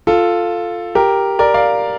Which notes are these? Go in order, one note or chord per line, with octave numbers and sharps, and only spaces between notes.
F4 A4
G4 A#4
A#4 D5
D5 F5